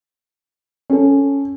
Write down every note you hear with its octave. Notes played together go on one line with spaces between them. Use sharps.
C#4 A4